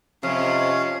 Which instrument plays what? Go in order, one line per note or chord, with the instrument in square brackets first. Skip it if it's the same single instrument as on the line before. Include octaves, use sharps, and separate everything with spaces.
[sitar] F2 [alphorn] C3 [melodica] C#4 F5